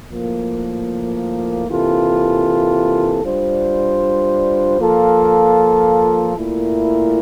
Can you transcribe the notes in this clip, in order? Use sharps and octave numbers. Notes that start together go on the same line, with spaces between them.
A2 F3 A#3
C3 E3 A#3 F4 A4
G3 D4 F4 C5
F3 A#3 F4 A4
A#2 A3 E4 A#4